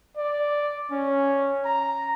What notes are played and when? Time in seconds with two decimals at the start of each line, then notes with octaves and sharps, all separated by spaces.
0.17 D5
0.92 C#4
1.65 A#5